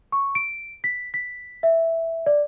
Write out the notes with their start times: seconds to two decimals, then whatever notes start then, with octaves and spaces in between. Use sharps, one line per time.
0.12 C#6
0.35 D7
0.84 B6
1.14 B6
1.63 E5
2.26 D5